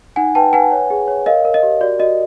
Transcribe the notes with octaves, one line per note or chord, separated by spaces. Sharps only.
D#4 F#5 G#5
B4 G5 A5
B4 F#5 G#5
C#5
G#4
C#5
A#4 D#5 F5
A#4
D#5
G4
F#4 D5
F#4 D#5